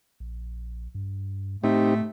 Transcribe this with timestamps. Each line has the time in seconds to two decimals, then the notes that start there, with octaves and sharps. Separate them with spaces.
0.20 A#1
0.95 G2
1.64 A2 A3 C4 D#4 G4